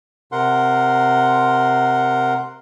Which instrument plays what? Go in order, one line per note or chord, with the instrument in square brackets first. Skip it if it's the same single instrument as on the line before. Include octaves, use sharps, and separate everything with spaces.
[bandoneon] C3 A#4 F#5 C6